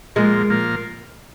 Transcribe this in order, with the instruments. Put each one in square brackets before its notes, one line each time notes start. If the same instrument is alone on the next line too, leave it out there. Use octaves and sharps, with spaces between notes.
[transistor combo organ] A#2 F3 A#3 F4 A#4 [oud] G#3
[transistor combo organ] A#2 F3 A#3 F4 A#4